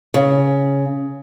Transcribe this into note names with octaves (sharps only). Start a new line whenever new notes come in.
C#3